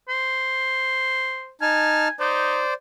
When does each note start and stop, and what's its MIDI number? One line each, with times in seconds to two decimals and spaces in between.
0.09 1.52 72
1.61 2.08 63
1.61 2.14 80
1.61 2.08 81
1.61 2.08 89
2.20 2.59 63
2.20 2.74 72
2.20 2.74 74